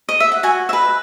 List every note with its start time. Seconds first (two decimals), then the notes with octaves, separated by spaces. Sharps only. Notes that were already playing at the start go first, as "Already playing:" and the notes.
0.09 D#5
0.20 E5
0.32 F#5
0.43 F#4 G#5
0.69 B4 D#5 E5